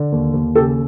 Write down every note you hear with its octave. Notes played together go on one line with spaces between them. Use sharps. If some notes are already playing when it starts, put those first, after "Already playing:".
Already playing: D3
D#2
D#2
C#3 G4 A4